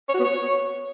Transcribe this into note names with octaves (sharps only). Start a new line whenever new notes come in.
C#5
F#4
B3
C#5